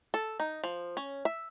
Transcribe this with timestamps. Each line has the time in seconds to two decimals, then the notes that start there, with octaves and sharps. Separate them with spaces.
0.14 A4
0.40 D#4
0.64 F3
0.97 C#4
1.25 E5